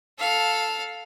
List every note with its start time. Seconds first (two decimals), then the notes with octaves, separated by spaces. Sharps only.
0.19 A4 F5